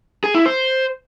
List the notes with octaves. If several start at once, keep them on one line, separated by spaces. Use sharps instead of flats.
G#4
E4
C5